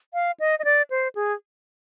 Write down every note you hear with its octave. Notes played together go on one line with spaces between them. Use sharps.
F5
D#5
D#5
D5
C5
G#4